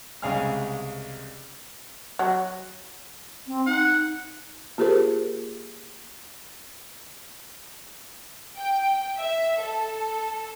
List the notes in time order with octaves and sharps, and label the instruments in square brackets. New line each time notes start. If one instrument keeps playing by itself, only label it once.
[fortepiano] C2 C#3 G#3 F5 G#5 F6
[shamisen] F#3
[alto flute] C4
[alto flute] D#4 [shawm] F#5
[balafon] A#3 F4 G4 G#4 A#4 C5
[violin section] G5
E5
A4